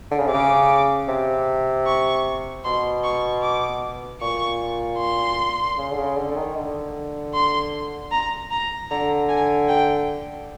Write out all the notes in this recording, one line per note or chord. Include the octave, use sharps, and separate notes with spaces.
D3
C#3
C3
C#3 D6
C3
C#6
B2 C6
C#6
D6
A#2 C#6
C6
C#3
D3
C#3
D3
D3
D#3
D3
C6
A#5
A#5
D3 A#5
G#5
G5